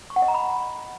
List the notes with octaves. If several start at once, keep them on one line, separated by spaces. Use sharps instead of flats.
C#6
F#5
D#5
A#5
B5